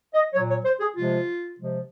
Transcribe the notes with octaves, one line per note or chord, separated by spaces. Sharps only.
D#5
A#2 F#3 C#5
C#5
C5
G#4
C3 F3 G#3 F4
C3 F3 G#3